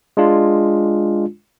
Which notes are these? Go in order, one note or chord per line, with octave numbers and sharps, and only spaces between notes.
G#3 D4 F4